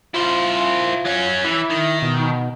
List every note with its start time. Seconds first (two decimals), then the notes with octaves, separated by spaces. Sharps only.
0.14 E4 F4 C5
1.05 F#3 C#4
1.44 E3 E4
1.70 D#3
2.02 B2